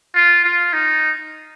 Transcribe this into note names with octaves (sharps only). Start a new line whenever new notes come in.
F4
F4
D#4